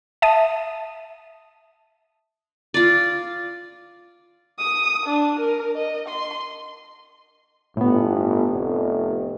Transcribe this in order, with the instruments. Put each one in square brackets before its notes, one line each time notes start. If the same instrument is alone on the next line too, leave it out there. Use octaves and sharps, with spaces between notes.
[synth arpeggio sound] E5 A5 D#6
[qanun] F4 D5
[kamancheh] D#6
D4
A#4
D#5
C6
[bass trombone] G1 [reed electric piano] A2 B3
[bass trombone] F1